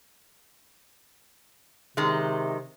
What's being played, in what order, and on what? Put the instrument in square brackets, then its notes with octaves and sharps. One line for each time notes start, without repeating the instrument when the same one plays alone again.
[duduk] C3 [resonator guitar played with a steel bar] D#3 G#3